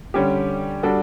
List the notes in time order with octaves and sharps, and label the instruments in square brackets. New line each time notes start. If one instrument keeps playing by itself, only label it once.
[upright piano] D3 G3 C#4 G4
G3 D4 F#4 A4